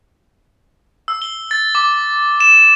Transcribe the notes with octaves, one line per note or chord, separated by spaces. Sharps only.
E6
G7
A6
D6
E7